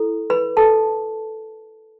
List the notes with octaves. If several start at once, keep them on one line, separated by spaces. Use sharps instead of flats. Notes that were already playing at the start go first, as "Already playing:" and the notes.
Already playing: E4 A4
B4 B5
A4 A5